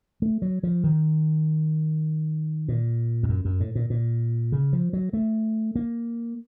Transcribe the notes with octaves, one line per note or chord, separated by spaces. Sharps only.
A3
F#3
F3
D#3
A#2
F2
F#2
F#2
A2
A#2
A#2
C#3
F3
F#3
A3
A#3